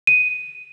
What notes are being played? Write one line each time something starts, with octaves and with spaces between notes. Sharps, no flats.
D#7